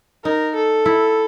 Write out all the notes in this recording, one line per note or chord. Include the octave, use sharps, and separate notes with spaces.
D#4 A#4
A4
E4